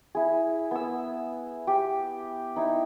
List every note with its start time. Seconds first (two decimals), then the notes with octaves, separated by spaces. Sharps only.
0.15 E4 G#4
0.71 B3 E6
1.67 G4
2.56 D#4 E4